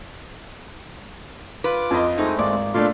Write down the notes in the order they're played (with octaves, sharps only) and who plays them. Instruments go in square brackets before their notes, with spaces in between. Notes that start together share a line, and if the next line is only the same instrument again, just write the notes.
[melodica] F4 D6 [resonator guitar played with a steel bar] B4
[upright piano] F2 D#5
[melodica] G#3 A3 C4 [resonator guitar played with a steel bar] D#4
[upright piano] G#1 [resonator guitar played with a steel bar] D5
[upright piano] A#2 A3 D4 [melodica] D5 F5 C6